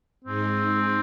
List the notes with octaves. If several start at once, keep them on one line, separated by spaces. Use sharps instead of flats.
G#2 G#3 C4 D#4 G#4